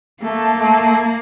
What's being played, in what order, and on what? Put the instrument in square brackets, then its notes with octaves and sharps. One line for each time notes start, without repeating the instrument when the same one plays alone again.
[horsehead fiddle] A3 [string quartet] A#3
[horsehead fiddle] A3